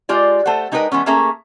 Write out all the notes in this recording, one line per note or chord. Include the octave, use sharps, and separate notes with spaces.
G#3 F4 G4 D5
A3 A4 C5 F#5
G#3 D#4 G4 A#4 B4 G5
E3 G#3 B3 C#4
A3 A#3 C#4 G#4 E5 A#5